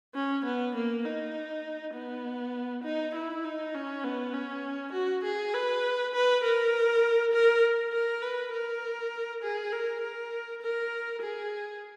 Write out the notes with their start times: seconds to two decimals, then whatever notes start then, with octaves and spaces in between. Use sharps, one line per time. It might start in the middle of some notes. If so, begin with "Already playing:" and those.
0.15 C#4
0.45 B3
0.75 A#3
1.05 D#4
1.94 B3
2.84 D#4
3.15 E4
3.44 D#4
3.74 C#4
4.04 B3
4.33 C#4
4.93 F#4
5.24 G#4
5.54 B4
6.14 B4
6.44 A#4
7.33 A#4
7.93 A#4
8.22 B4
8.53 A#4
9.43 G#4
9.72 A#4
10.02 A#4
10.62 A#4
11.22 G#4